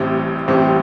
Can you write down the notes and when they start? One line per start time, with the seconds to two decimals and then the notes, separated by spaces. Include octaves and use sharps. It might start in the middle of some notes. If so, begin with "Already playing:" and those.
Already playing: A1 A2 G3 C4 G4
0.48 A1 A2 G3 C4 G4